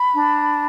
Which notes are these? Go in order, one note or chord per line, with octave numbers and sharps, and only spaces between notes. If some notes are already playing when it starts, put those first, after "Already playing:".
Already playing: B5
D4